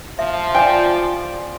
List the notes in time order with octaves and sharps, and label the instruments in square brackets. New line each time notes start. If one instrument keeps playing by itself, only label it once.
[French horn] F3 [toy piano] E5
[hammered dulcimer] F4 C5 D5 [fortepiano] G5 [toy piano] G#5